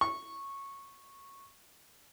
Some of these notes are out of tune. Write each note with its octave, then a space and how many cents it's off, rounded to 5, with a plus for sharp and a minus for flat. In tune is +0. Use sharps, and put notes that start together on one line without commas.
C#6 -10